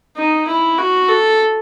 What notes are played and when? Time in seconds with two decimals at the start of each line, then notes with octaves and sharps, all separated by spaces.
0.17 D#4
0.48 E4
0.78 F#4
1.09 A4